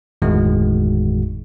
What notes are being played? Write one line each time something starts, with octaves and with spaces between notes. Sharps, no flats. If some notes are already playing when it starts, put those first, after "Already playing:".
G1 E2 A2 D#3 G#3 F#4